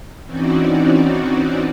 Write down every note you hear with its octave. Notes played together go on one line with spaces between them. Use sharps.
E3 C4 C#4 D#4 F#4 D5